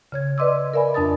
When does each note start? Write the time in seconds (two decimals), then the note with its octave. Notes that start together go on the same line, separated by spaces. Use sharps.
0.12 C#3 C#5 G#6
0.38 B4 D5 D#5 C6 D6 E6
0.74 A#4 D5 E5 G#5 B5
0.94 F2 D4 A5 D#6 A6